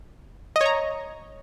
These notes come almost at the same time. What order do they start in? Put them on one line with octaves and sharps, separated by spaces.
D#5 C#5 A#5